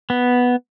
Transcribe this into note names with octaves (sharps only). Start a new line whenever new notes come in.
B3